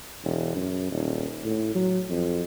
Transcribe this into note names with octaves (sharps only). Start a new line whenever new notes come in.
E1
F#2
D#1
A2
F#3
F2